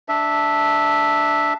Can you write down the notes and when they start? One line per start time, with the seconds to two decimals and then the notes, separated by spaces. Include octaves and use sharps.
0.09 D4 E5